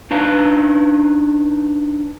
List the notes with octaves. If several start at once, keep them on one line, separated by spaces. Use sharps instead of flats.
D4 D#4 B4 F5 A#5